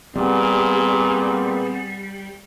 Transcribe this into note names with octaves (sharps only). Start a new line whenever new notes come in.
A#2 G3 B3 C4 G#4